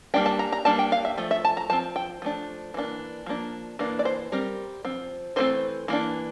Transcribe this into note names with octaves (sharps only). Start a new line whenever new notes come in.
G3 A#3 D4 G5
A5
A#5
A#5
G3 A#3 D4 A5
G5
F5
E5
F3 A3
E5
A5
A#5
F3 C4 A5
G5
F3 A3 D4
E3 A#3 D4
F3 A#3 D4
E3 A#3 D4
D5
C5
G3 C4 A#4
F3 C4
E3 A3 C4 C5
E3 A#3 D4